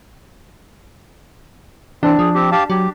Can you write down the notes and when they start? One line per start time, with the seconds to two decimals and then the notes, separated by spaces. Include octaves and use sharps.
2.03 E3 C4 D4
2.19 F3 G#4
2.34 C4 G4
2.52 G4 F5 A5
2.70 F#3 G4